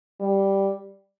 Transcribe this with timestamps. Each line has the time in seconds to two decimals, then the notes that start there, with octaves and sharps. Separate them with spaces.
0.20 G3